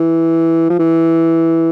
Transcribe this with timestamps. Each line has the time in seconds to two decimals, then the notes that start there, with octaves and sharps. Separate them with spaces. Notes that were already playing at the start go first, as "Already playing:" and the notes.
Already playing: E3
0.70 F3
0.79 E3